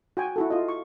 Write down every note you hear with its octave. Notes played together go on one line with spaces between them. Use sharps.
F#4 G5 G#5
E4 F#4 A4
F4 D#5
C#6